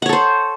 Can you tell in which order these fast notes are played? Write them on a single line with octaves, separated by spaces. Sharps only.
F#5 C#5 A4 C5